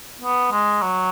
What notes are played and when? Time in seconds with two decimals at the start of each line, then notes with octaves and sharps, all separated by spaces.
0.21 B3
0.52 G#3
0.82 F#3